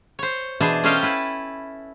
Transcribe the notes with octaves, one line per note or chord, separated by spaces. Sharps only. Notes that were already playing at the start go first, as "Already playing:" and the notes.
C5 C#5
B2 E3 D4 G#4 C5 A5
C#4 A4 C5 D#5 F5 G5
E4 B4